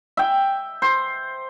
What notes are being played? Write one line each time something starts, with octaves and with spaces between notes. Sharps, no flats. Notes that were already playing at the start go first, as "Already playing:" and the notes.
E5 G5
C5